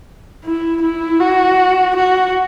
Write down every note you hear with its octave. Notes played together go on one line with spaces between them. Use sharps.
E4
E4
F#4
F#4